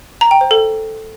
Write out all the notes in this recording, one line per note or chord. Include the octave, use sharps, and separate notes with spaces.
A#5
G5
C5
A4